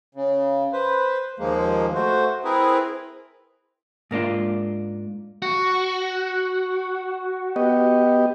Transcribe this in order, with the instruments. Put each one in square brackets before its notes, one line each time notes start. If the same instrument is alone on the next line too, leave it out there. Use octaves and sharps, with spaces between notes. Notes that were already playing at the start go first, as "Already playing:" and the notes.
[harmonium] C#3
B4 C5
D#2 F3 G#3 A#3
A3 F#4 C5
C4 E4 G#4 A#4 B4
[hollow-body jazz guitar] G#2 A#3 D4 F4
[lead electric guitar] F#4
[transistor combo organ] B3 G4 D#5